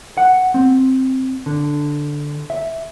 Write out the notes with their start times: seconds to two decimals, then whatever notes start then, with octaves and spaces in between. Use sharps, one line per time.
0.17 F#5
0.54 C4
1.46 D3
2.50 E5